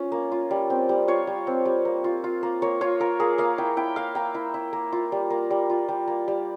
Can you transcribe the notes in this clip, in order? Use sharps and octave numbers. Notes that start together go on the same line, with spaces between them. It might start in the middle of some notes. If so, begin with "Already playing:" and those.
Already playing: C#4 F4
A#3
F4
G3
C4
G3
F4 C#5
G3
C4
G3
A#3
F4
F4
A#3
A#3 C#5
F4 C#5
F4 A#4
A#3 G#4
A#3 F5
E4 G5
E4 G5
A#3 F5
A#3 G5
E4
E4
A#3
F4
G3
A#3
G3
F4
G3
A#3
G3